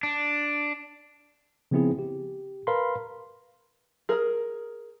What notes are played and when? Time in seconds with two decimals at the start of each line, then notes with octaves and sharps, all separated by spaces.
0.03 D4
1.71 C#3 F3 B3 C4 E4 G#4
1.99 G4
2.67 A#4 B4 F5 B5 C6
4.09 G#4 A#4